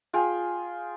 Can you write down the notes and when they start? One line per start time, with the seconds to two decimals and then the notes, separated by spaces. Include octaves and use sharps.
0.13 F4 G#4 G5